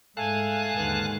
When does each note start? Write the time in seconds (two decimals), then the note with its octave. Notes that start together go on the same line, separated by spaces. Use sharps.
0.17 G#2 A3 F5 G#5 A5 F#6
0.76 D#2 G#2 D3 B3